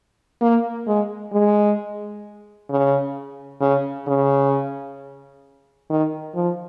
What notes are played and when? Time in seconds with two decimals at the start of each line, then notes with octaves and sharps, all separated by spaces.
0.42 A#3
0.87 G#3
1.33 G#3
2.70 C#3
3.61 C#3
4.07 C#3
5.90 D#3
6.35 F3